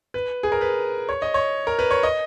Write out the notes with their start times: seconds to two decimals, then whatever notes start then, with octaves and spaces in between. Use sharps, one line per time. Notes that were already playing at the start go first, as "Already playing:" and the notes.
0.14 B4
0.43 G#4
0.52 A#4
0.61 B4
1.09 C#5
1.22 D#5
1.34 C#5
1.67 A#4
1.79 B4
1.91 C#5
2.03 D#5